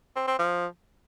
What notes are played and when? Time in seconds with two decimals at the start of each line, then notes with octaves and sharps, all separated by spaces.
0.16 C4
0.27 C4
0.39 F3